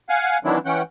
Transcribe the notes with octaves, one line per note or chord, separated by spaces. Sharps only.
F5 F#5 G#5
D#3 E3 F#3 C4 D4 E4
E3 C#4 F#5 G5